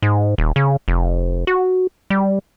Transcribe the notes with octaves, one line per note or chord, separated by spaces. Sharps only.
G#2
D#1
C#3
F1
F#4
G3